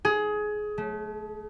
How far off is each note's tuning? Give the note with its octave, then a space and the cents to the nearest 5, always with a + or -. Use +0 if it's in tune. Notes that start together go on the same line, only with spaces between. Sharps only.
G#4 +20
A3 -25